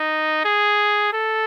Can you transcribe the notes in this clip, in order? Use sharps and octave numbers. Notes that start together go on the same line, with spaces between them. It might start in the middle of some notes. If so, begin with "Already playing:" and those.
Already playing: D#4
G#4
A4